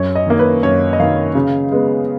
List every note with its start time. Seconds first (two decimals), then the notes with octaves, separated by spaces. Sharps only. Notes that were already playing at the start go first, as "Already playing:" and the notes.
Already playing: F#2 C#5
0.15 D#5
0.27 D#3 A#3
0.39 B4
0.63 F#2 C#5
0.93 D#5
1.00 D#3 A#3 F5
1.35 C#3
1.72 G#3 B3